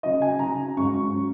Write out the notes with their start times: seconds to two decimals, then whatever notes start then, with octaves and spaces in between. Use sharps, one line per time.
0.03 C#3 F#3 D#4 D#5
0.22 G#5
0.39 C#3 F#3 D#4 A#5
0.77 G#2 F#3 C#4 C#6
1.14 F#3 C#4